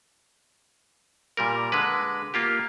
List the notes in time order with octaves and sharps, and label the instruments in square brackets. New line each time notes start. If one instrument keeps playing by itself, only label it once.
[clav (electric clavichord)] A#2 G3 A#4
D3 G#3 B4
A#3 F4 G4